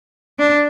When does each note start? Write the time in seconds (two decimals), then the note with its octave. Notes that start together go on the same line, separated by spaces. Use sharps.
0.39 D4